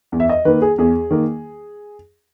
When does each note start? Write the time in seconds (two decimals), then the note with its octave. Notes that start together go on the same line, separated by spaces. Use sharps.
0.12 E2
0.20 E5
0.29 D#5
0.45 D#3 A#3 B4
0.62 G#4
0.78 E2 G#4
1.11 D#3 A#3